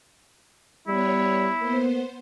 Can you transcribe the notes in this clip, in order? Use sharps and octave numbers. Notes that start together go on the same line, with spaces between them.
G3 B3 E4 C#5
A#3 B3 C5